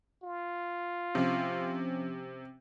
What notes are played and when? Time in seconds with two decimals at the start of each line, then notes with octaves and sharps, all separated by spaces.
0.23 F4
1.15 C3 F3 C#4